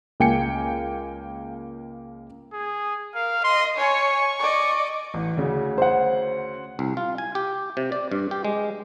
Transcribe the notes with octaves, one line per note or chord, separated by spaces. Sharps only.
C#2 A#3 G5 G#5 C#7
G#4
A#4 F5
D#5 C6
C#5 G#5 C#6
D5 D#5
A1
D2 C#3
C5 F#5
C2
F4
G#5
G4
C3
D5
G2
G4
G#3